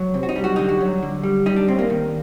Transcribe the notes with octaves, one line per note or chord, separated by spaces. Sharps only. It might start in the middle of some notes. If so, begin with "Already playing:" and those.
Already playing: F#3
C3
F#4
D#4
G3
F#4
D3 D#4
F#4
F#3
D3
G3
G3 D#4
D4
A2 C4
A#3
D#3